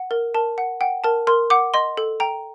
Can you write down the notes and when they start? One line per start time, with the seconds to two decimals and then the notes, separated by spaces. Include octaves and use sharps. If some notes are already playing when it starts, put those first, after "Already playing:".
Already playing: F#5
0.11 A#4
0.35 A#4 A5
0.58 F#5
0.81 F#5 G5
1.04 A#4 A5
1.27 A#4 C6
1.50 F#5 D6
1.74 D#5 C6
1.97 A4
2.20 G5 A#5